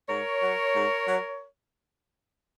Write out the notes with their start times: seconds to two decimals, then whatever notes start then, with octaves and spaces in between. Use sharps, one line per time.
0.08 G#2 A#4 C#5
0.41 F#3
0.73 G#2
1.05 F#3